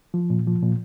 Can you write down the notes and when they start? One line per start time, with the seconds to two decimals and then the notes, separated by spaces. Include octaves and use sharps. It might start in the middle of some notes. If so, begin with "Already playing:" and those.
0.14 F3
0.30 A#2
0.47 F3
0.63 A#2